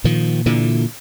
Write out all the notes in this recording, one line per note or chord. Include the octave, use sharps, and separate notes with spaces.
A#2 D#3 F3
A#2 D3 E3